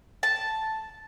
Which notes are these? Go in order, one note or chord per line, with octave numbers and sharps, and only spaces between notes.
A5